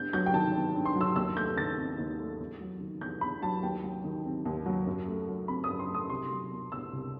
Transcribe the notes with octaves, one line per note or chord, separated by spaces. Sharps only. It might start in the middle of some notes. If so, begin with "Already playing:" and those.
Already playing: G2 B3 G6
F#3 G6
G5
D#3 A5
B3
G2
C6
F#3
E6
D#2 E6
A3 G6
D#3 A6
C4
D#2
A3
E2
F#3
D#3
E2 G6
E2 B5
F#3 A5
D#2 G5
F#3
D#3
C4
D#2
F#3
F#2
A3
F#3
C4 B5
D#6
F#2
C6
A3
D#6
C2 C6
F#3
B2
B3 E6
C2